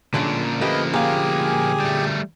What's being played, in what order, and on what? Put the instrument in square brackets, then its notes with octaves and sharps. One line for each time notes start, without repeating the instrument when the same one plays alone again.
[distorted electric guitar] D2 C#4 [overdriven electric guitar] A#2 D4 [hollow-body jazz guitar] D3 F#3 G#3
[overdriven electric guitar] F3 A#3 [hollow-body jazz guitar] A3 G4 [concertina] B4 D#5
[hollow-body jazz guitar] A#2 F5 [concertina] G4 G#4 G#5
[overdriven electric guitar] G3 A3